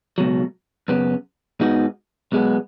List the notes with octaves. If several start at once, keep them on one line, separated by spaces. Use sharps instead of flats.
C#2 B2 F#3
F#2 C#3 B3
G#2 G#3 B3 D#4 F#4
B1 B2 G#3 B3